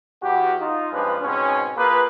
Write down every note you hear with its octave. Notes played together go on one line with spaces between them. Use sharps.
E2 F#4 G4
D#4 F4
G2 F3 G#3 C#4 D4 B4
G#2 B2 C4 C#4
A#3 F4 G#4 B4